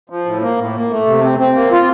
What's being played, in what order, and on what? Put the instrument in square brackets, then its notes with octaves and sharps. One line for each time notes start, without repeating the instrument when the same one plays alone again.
[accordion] F3
A2
A#3
A2
A#3
A3
C3
C4
C4
A#3
F4